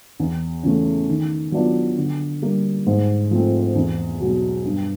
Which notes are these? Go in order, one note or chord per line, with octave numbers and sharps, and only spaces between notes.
E2
C#3 E3 A3
D#3
F#3 B3 D4 F4
D3
G3 A#3
G#2
F3 A3 C4
E2
B2 F#3
G2